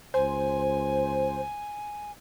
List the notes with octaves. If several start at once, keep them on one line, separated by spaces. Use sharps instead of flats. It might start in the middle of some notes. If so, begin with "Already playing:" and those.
C#2 C5 G#5